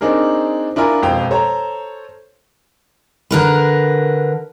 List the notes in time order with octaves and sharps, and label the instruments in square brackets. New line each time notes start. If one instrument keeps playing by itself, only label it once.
[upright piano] C4 D4 D#4 G#4 A#4
D4 E4 F4 A#4 G#5
E1 F2 C5 F5 G5
A4 C5 C#5 A#5
[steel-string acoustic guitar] D3 A#4 B4